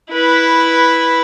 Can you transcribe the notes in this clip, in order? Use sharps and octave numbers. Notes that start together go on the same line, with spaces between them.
E4 B4